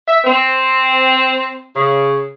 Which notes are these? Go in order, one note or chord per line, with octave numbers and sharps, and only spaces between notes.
E5
C4
C#3